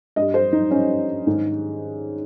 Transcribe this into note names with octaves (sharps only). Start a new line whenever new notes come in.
G2 G3 D#5
C5
D#4
C#4
G#2 D#3 G#3